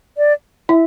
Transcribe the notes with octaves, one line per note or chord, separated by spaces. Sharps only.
D5
E4 E5